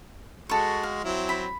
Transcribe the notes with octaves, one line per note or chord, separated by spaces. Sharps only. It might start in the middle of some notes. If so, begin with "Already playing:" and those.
G#3 F#4 A4 C#6
F5
F#3 C4 E4
B5